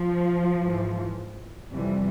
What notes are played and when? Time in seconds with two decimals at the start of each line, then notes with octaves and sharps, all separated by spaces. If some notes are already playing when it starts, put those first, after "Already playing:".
Already playing: F3
0.64 G#2 E3
1.72 F2 C3 E3 G3